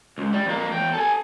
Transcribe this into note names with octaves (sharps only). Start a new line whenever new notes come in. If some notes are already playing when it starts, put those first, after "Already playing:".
C#2
G3
F2 A#3
E2 G5
A4 G#5